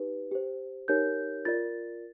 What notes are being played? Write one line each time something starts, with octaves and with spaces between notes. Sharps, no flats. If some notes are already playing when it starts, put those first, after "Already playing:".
Already playing: D#4 G4 B4
G4 C5
D#4 G4 A#4 C#5 G6
F4 A#4 D5 A6